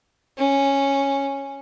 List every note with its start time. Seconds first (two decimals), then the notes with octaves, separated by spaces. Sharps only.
0.38 C#4